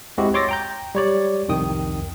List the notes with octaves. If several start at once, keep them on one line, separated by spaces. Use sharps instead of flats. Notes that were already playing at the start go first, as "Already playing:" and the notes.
G#3 C4 E4 F#4 G4
C#5 C6 D6 E6 A6 A#6
G5 A#5 G6
G3 C#5 D5
C2 F2 D#3 G5 D#6